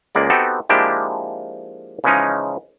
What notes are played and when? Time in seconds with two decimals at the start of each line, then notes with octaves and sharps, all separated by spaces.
0.15 C#2 G#3 A#3 D5
0.30 B3 C4 D#4 F#4 G4 A4
0.69 F3 G#3 A#3 D4 E4 G4
2.04 C#3 E3 F3 G#3 C#4 D#4